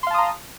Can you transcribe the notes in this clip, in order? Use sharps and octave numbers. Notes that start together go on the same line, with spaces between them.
F5 A5 A#5 C6 D#6